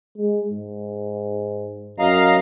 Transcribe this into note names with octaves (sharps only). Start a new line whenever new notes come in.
G#3
G#2
F#2 D#5 F5 A#5